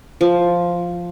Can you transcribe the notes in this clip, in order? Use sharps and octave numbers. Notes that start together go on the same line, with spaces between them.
F3